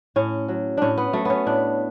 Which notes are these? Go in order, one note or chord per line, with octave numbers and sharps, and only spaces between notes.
A2 C#4
F#3
A2 C#4 D4
B3
F#3 A3
B3 C#4
A2 D4